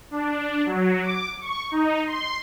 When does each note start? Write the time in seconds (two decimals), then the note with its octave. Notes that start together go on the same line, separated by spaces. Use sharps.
0.11 D4
0.66 F#3
1.02 D6
1.41 C#6
1.71 D#4
2.07 C6